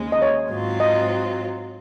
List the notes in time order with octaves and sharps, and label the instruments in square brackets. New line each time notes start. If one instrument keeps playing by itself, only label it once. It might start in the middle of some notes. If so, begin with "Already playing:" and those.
Already playing: [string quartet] D#2 C#3 G#3
[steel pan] D#5
C#5
[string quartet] G#2 F#3 C4 F4
[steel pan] D#5